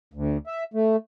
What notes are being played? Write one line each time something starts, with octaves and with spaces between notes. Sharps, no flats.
D2
E5
A3